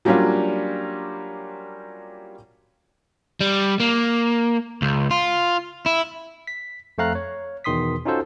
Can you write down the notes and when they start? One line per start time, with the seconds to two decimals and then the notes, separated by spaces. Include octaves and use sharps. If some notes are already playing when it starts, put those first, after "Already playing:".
0.05 F#3 G3 A#3 C#4 D4 F4
3.41 G3
3.80 A#3
4.82 C#2
5.11 F4
5.86 E4
6.47 B6
6.98 F2 A3 C4 F5 A#5 F#6
7.15 C#5
7.64 E2 B2 D#3 C6 D#6 B6
8.05 C#4 D#4 F4 F#4 A4 C5